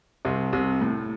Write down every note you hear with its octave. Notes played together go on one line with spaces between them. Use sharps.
C2 C3
C2 C3
A2